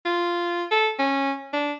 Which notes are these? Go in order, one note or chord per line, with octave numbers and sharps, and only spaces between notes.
F4
A4
C#4
D4